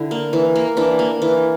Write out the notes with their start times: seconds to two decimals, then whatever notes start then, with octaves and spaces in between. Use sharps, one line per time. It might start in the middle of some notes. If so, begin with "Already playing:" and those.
Already playing: D3 E4
0.11 A#3
0.33 E3
0.56 A#3
0.77 E3 D4
0.99 A#3
1.22 E3